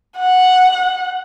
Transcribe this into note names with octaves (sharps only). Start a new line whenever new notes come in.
F#5